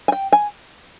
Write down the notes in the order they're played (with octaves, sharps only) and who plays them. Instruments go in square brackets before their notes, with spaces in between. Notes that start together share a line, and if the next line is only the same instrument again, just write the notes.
[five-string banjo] G#5
G5
G#5